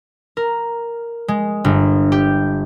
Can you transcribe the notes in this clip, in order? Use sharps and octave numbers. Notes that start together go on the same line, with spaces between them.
A#4
G#3
G1
G4